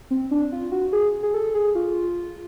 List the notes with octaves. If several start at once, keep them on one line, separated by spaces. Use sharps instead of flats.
C4
D4
F4
F#4
G#4
G#4
A4
G#4
F4